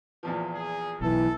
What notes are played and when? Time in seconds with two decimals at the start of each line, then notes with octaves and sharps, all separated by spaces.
0.23 E2 A#2 F3
0.54 G#4
1.01 B1 E3 A4